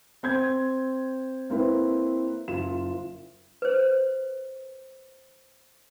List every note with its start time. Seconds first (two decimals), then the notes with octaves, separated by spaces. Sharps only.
0.23 C4 G6 G#6
1.50 A#3 C4 E4 B4
2.48 F#1 F4 E7
3.62 B4 C5